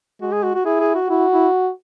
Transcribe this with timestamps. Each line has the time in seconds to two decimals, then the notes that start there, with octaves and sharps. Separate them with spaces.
0.21 G#3 F#4
0.32 G#4
0.43 F#4
0.54 F#4
0.65 E4 G#4
0.80 G#4
0.95 F#4
1.09 E4 F#4
1.32 E4